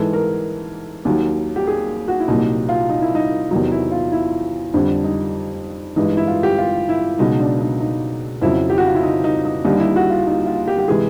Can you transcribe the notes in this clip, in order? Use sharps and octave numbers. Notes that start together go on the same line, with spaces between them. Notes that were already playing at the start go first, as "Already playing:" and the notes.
Already playing: G#2 E3 G#3 A4
A#4
D#2 D#3 F#3
G4
G#4
F#4
E4
C2 A#2 F#3 D#4
F4
D#4
E4
D#4
E2 C3 D#3 F#3 D#4
E4
F4
E4
F2 D3 G3 D4
D#4
G2 E3 G#3 D#4
E4
F4
G4
F4
E4
C#2 B2 F#3 D#4
D4
D#4
D#4
F2 C#3 F#3 E4
G4
F#4
F4
E4
D#4
D#4
D#4
D#2 D3 G3 D#4
E4
F#4
F4
D#4
F4
G4
G4
C3 E3 G#3 G#4